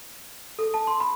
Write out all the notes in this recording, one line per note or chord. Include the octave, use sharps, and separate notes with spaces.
A4
A5
C6
B5